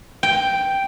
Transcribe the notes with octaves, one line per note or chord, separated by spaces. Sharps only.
G5